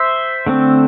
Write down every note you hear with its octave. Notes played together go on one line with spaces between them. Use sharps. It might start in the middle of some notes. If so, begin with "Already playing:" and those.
Already playing: C5 E5
D3 A3 C4